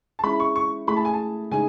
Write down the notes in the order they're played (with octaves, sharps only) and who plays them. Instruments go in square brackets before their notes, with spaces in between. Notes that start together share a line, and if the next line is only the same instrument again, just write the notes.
[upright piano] A5
[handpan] G#3 C#4 E4 [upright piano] B5
[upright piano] C#6
C#6
[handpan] A3 E4 G#4 [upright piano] B5
[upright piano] A5
G#5
A5
[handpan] C#3 G#3 D#4 G#4 [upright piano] G#5